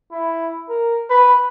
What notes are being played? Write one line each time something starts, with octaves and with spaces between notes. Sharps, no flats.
E4
A#4
B4